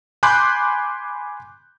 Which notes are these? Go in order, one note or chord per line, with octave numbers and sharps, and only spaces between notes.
G#5 B5 C6 D6 F#6 G6